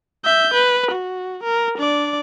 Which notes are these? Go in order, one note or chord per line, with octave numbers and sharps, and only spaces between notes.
E5 G6
B4
F#4
A#4
D4 D5